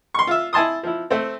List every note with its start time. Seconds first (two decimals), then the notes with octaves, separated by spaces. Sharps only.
0.14 C6 C#6
0.27 F4 E5
0.53 E4 G#5 A5 C6 D#6
0.83 F3 E4
1.10 A3 C4